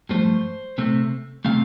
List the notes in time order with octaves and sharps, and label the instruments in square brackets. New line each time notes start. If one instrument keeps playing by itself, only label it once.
[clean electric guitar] G2 F3 A3 C5
C3 A3 C4
C3 A3 C4 F5